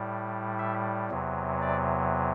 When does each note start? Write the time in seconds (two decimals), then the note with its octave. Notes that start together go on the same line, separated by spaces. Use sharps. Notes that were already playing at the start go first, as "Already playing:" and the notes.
Already playing: A2 G3
0.59 E5
1.10 E2 C3 F#3
1.61 D5